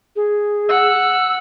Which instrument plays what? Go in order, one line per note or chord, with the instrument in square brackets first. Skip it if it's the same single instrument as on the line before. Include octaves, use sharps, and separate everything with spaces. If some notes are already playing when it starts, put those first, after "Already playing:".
[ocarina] G#4
[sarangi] F#5 [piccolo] E6